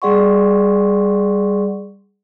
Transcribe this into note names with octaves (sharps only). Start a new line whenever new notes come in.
G3 G#4 D5 F#5 C6 C#6